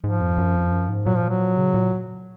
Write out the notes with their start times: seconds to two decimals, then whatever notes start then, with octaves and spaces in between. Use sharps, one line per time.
0.03 G#2 F3
0.21 F2
0.38 F#2
0.55 F2
0.71 F#2
0.89 G#2
1.05 A#2 F#3
1.18 F3
1.29 F#3
1.57 C#3
1.74 A#2